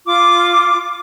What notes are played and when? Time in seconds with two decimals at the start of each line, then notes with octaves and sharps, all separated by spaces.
0.07 F4 D6